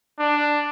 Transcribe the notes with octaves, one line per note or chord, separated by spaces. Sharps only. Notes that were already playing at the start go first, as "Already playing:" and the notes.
D4